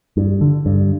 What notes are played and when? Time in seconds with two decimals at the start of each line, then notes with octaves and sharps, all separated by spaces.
0.17 G2
0.41 D3
0.66 G2